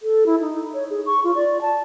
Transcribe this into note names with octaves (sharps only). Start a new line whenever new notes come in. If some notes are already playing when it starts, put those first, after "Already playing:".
A4
E4
D#4
C#5
G#4
C#6
F4
D5
A5